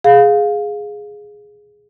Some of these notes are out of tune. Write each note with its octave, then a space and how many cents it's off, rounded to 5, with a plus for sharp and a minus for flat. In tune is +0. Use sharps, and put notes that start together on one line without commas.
G#4 +0 F5 +10